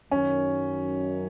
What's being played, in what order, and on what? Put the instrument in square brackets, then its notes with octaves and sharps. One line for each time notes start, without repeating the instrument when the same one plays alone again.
[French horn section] F#2 D#3 F#3 [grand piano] C#4